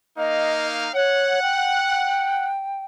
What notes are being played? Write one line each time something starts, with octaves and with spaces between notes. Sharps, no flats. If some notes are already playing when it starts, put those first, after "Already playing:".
A#3 D#4 D#5 F5
C#5 F#5
G5